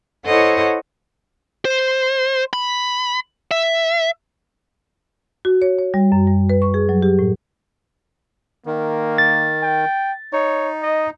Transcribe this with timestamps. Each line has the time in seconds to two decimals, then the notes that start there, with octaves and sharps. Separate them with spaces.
0.25 E4 A4 C5 C#5 D#5 F#5
1.65 C5
2.53 B5
3.51 E5
5.45 F#4
5.62 C#5
5.78 C#5
5.94 G3
6.12 F#2
6.28 G3
6.50 B4
6.62 C#6
6.74 G#4
6.89 F#3
7.02 G4
7.19 A2
8.66 D#3 A#3
9.18 A6
9.63 G5
10.33 D#4 C#5
10.83 D#5